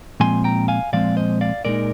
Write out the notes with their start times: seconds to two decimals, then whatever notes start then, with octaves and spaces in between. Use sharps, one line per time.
0.20 A#2 F3 G#3 C4 G#5 C6
0.44 G5 A#5
0.68 F5 G#5
0.93 A#2 F3 G#3 C4 D5 F5
1.17 C5 D#5
1.41 D5 F5
1.65 A#2 G#3 D#4 A#4 D5